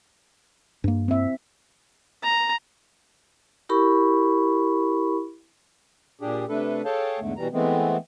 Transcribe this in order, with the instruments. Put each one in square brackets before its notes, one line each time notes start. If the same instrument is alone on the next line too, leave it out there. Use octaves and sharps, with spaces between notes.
[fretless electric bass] G2 A#3
[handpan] C4 E5
[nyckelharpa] A#5
[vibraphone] E4 G4 A#4 B5 C#6
[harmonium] A#2 D4 G4 G#4
C3 A3 D4 A4 B4
G#4 A4 C#5 F5 G5 A5
E2 G#2 D3 A3
B2 E3 G3 A#5
E3 G#3 A3 B3 C4